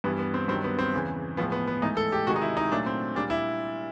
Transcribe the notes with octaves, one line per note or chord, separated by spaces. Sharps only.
G2 E3 G3 B3
B3
C4
G2 D#3 F#3 C4
B3
C4
E2 C#3 E3
A2 F3 G#3 B3
B3
B3
G#2 E3 A3 D#4
A4
G4
C3 D#3 G#3 F#4
D#4
E4
D#4
A#2 F#3 A3 D4
C4
A#2 G3 D4
E4